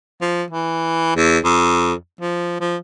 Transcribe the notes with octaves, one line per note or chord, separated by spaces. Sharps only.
F3
E3
E2
F2
F3
F3